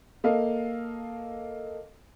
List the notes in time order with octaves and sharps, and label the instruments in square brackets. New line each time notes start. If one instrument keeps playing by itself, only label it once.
[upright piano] A#3 A4 D#5 F5